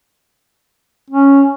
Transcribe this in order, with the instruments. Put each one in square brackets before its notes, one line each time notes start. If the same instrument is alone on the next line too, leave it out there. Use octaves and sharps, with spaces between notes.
[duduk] C#4